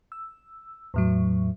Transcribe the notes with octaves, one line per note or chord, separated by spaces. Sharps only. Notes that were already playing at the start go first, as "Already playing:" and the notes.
E6
E2 A2 F#3